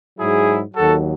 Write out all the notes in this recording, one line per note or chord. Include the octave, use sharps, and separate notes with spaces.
G#2 F#3 E4 G#4
D#2 D#3 F#3 F#4 A4